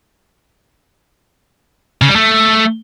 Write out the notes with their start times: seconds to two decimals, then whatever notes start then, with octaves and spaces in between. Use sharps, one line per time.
2.02 C#3
2.09 G3
2.16 A3